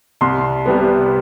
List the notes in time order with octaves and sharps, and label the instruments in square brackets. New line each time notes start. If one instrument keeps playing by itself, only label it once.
[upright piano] C2 C6
C3 G3 B3